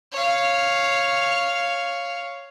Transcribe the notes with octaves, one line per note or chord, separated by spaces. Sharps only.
C#5 F5